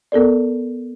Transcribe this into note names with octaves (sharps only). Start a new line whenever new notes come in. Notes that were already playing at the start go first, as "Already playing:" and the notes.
B3 A4 A#4 D5